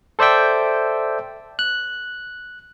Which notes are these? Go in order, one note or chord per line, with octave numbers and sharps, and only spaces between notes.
A4 C5 D5 E5 G5
F#6